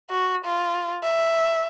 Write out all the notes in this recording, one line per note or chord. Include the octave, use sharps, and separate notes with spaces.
F#4
F4
E5